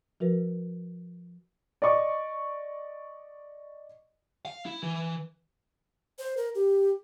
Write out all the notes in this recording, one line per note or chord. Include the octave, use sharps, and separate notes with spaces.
F3 F#4 A#4 B4
D5 D#5 C#6 D6
F5
E4
E3
C5
A#4
G4